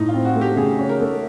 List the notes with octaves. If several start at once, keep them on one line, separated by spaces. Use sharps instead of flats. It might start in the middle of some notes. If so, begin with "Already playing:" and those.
Already playing: A2 D#4
F4
C4
F#4
A3
G4
C#3 G#4
C#4
A#4
A3